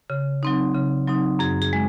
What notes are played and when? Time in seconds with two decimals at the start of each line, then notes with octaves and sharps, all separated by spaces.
0.10 C#3
0.43 F#3 C4 D#4
0.75 C#3
1.07 F#3 C4 D#4
1.39 F#2 G#4
1.62 G#4
1.73 G#3